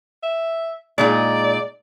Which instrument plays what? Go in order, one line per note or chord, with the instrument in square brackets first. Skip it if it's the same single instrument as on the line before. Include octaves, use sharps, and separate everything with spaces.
[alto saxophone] E5
[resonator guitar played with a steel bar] A#2 G#3 D#4 [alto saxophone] D5